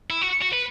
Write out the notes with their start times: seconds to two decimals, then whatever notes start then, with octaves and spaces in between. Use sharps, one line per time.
0.10 E4
0.22 F#4
0.42 F#4
0.53 B4